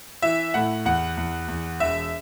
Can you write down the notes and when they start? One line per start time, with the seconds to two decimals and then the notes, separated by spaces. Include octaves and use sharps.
0.22 E3 E5
0.54 A2 F#5
0.85 E2 F#5
1.17 E2
1.48 E2
1.80 E1 E5